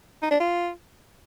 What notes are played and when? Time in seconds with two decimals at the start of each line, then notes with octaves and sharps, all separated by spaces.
0.22 D#4
0.31 D4
0.40 F4